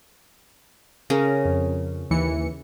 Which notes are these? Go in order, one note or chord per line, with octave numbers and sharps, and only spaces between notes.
C#3 C#4 A#4
F2
D#2 E3 C#7